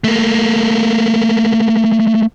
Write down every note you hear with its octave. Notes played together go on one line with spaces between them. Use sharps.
A3 A#3